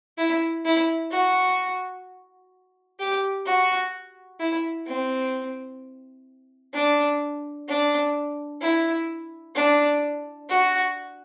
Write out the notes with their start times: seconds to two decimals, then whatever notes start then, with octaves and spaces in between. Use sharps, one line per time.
0.18 E4
0.65 E4
1.11 F#4
2.99 G4
3.46 F#4
4.40 E4
4.87 C4
6.74 D4
7.68 D4
8.62 E4
9.56 D4
10.49 F#4